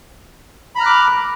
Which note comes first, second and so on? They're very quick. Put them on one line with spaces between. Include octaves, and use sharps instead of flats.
B5 A#5 F6 F#6 D6